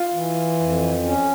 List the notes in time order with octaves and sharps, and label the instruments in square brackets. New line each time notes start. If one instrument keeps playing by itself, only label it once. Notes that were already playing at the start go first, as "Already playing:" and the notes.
Already playing: [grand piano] F4
[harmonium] E3
F2
C#4